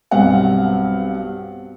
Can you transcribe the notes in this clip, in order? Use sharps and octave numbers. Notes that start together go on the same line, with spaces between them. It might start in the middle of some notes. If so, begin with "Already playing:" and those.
B1 G2 B2 C4 F5 F#5